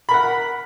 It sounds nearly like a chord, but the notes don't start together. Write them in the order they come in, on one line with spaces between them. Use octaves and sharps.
B5 A#4 F#5